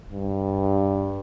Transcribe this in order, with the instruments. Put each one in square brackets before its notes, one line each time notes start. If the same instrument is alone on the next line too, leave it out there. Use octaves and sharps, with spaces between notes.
[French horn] G2